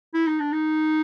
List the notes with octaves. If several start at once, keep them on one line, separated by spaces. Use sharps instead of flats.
E4
D#4
D4
D#4